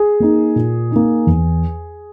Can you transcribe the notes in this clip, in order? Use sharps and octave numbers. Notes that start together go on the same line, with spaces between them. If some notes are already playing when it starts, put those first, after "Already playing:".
Already playing: G#4
A#3 D#4
A#2
A#3 D#4
E2